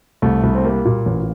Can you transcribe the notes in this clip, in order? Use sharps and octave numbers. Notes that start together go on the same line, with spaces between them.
C2 A3
C2
C4
G3 A#3
A#2
A1